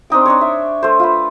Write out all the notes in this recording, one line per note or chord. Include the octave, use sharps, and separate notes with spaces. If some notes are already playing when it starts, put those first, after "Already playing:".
C4 D4 D#4 G5
D4 D#4 C#5
E5
A3 C5
F4 B4